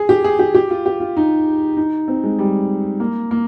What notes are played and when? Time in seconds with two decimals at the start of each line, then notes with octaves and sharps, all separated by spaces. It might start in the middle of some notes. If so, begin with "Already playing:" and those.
Already playing: G#4
0.09 G4
0.24 G#4
0.39 G4
0.55 G4
0.70 F4
0.86 G4
1.00 F4
1.17 D#4
1.77 D#4
2.08 C4
2.24 G#3
2.39 G3
3.00 A#3
3.31 A#3